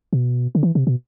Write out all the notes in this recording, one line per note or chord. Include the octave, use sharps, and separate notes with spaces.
B2
D3
E3
C3
B2